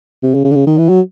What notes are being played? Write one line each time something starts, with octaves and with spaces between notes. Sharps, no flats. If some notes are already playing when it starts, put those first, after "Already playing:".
C3
C#3
C#3
D3
C#3
D#3
E3
F#3